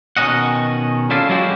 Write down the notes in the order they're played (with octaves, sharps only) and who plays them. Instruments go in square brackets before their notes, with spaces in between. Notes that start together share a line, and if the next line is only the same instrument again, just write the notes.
[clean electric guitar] B2 D#3 A#3 C#4 D#5 F#5
C#4 E4 F4 A4 D5 F5
F#3 G#3 A#3 E4 F#4 G4